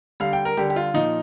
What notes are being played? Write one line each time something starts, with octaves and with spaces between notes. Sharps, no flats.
D3 G3 F5
G5
A#4
D3 G3 G4
G4
F4
A#2 F3 D#4